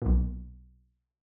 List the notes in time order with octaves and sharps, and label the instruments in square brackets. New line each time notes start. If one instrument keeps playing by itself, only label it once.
[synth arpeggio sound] B1 A#2